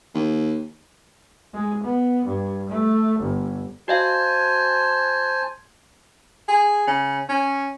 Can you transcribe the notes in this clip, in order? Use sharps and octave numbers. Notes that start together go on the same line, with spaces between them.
D#2
G#3
B3
G2
A3
G1
F#4 C5 D#5 F5 G#5 A5
G#4
C#3
C#4